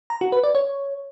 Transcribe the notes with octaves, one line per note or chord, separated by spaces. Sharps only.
A#5
F#4
B4
D5
C#5